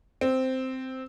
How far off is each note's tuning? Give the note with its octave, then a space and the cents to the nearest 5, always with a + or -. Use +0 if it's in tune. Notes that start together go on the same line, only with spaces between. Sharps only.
C4 -5